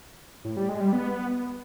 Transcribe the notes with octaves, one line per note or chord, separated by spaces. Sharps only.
A2
G3
G#3
G3
B3